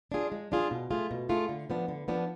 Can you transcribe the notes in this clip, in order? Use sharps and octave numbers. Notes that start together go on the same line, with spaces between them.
D4 F4 G#4
G#3
D4 F4 G#4
B2
A3 F4 G#4
B2
A3 F4 G#4
D3
F3 B3 D4
D3
F3 B3 D4